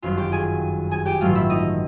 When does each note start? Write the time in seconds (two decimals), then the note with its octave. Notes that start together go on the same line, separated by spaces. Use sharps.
0.02 G1 F#2 D#3 F4 F5
0.17 G4 G5
0.32 G#4 G#5
0.91 G#4 G#5
1.06 G4 G5
1.20 A1 G2 D#3 F#3 A3 F4 F5
1.35 E4 E5
1.50 D#4 D#5